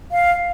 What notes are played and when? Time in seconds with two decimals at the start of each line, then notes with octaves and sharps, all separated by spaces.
0.12 F5